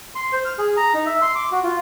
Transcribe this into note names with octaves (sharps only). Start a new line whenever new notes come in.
C6
C5
F6
G#4
A#5
D#4
E5
C6
D6
F#4
F4